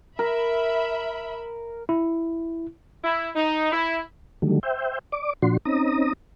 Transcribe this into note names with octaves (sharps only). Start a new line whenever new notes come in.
A#4 E5 B5
E4
E4
D#4
E4
D3 D#3 F#3 G3 A3
C5 E5 G5
D5 D6
A#2 F3 D4 F#4 C6
C4 C#4 D#4 A#5 D#6